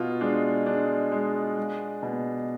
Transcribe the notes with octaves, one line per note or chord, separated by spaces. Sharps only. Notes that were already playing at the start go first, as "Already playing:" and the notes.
Already playing: B2 F4
G#3 D4
G#3 D4
G#3
G#3
B2